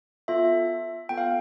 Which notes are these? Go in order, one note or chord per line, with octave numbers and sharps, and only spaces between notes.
B3 F4 A4 E5
B3 F4 A4 G5
F5